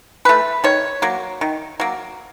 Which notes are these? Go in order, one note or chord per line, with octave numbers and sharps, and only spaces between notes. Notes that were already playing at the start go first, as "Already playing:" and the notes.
E3 A3 B4
D#3 C#5
F#3 A#3
D#3
F#3 A#3